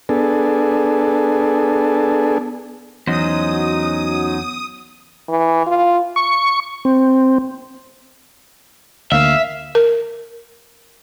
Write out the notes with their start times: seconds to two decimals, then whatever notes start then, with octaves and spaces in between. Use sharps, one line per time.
0.09 B3 D4 G#4 A4
3.07 E2 F#3 C#4 D#4 C5 D#6
5.29 E3
5.67 F4
6.16 C#6
6.85 C4
9.12 D2 A#3 E5 F5
9.75 A#4